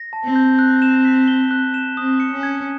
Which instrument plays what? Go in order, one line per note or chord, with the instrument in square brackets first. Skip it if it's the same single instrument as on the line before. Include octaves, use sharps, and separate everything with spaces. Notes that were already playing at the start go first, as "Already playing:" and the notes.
Already playing: [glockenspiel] A#6
A5
[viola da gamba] C4
[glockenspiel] G6
F#6
E7
B6
G7
F#6
E7
[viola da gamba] C4 [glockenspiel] D#6
[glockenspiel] C#7
[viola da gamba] C#4
[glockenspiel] G#6